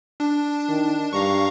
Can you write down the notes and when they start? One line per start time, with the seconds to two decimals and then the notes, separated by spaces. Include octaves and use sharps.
0.20 D4
0.68 D#3
1.13 G2 F5 A#5 C#6